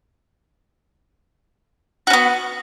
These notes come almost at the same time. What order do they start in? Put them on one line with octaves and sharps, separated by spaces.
F#4 C#4 B3